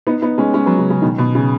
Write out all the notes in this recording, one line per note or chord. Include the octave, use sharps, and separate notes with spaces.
B3 D#4
B3 D#4
G#3 C#4
G#3 C#4
F#3 B3
C#3
C#3
B2 D#3
B2
C#3